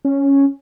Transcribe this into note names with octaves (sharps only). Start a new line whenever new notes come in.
C#4